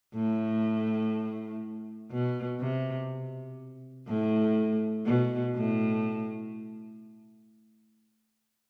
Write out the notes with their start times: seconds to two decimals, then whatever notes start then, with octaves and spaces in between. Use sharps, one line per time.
0.15 A2
2.11 B2
2.60 C3
4.08 A2
5.06 B2
5.54 A2